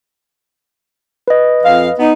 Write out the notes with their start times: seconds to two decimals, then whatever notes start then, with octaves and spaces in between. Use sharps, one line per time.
1.28 B4 D#5
1.62 F2 F5
1.99 B3 D#4